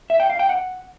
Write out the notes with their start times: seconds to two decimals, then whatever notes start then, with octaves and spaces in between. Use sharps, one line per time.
0.10 E5
0.20 G5
0.30 F5
0.39 G5
0.49 F#5